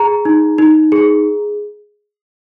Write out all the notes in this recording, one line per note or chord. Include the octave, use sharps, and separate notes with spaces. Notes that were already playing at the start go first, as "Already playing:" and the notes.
Already playing: G#4 A#5
D#4
D#4
G#4